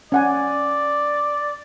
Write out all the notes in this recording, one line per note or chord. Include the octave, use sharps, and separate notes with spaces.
C#4 D5 F#5 G#5